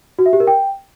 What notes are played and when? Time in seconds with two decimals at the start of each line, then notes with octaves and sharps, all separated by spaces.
0.19 F#4
0.26 E5
0.33 G4
0.40 A#4
0.47 G5